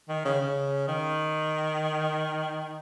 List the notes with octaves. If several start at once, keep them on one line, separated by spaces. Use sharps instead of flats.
D#3
C#3
C#3
D#3